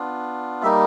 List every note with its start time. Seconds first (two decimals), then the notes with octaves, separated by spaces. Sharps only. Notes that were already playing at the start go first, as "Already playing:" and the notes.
Already playing: B3 D4 F4
0.63 G3 A#3 D#4 E5